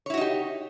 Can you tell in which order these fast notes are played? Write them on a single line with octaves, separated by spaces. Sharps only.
C#5 E4 F#4 D#4 G4